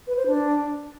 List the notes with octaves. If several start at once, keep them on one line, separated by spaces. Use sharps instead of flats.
B4
C5
D4